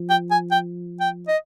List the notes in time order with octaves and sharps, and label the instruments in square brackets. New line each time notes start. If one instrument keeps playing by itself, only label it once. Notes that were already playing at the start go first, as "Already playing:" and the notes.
Already playing: [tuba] F3
[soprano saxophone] G5
G#5
G5
G5
D#5